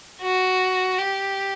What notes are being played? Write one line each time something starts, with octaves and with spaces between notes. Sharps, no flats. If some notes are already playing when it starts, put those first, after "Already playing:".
F#4
G4